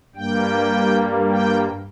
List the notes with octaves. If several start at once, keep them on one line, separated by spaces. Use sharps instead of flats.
G2 G3 A#3 G5
G5